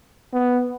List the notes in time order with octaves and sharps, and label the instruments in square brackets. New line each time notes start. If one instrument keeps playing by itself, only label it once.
[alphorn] B3